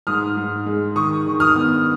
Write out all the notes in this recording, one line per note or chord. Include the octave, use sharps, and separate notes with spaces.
G#2 D#6 F6
G#2
G#3
D#3 C#6 D#6
D#3
D#6 F6
B3